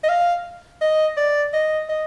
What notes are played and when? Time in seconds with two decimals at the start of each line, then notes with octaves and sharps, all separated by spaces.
0.04 D#5
0.09 F5
0.81 D#5
1.17 D5
1.54 D#5
1.89 D#5